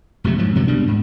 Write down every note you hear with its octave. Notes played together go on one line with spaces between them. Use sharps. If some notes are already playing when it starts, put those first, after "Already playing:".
E1 F2 C3 A3
G#2 F3 F#3
F#2 C3 D#3 F#3
C#2 B2 G3 D4
G#2